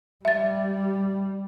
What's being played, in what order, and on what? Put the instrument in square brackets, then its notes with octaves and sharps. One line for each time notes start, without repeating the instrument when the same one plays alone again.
[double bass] G3 [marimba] E5 A6